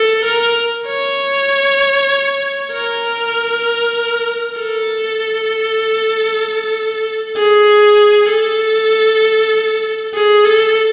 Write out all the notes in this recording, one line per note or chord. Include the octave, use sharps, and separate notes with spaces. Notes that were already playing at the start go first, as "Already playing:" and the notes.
Already playing: A4
A#4
C#5
A#4
A4
G#4
A4
G#4
A4